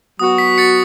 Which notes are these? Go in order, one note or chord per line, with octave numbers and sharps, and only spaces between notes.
F#3 B3 F#4 D#6
B6
A6 C#7